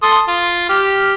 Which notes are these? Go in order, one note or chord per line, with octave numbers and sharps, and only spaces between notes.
A4 C6 D#6
F4
G4 F6